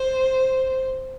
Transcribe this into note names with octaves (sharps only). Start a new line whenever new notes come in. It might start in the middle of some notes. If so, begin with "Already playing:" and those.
Already playing: C5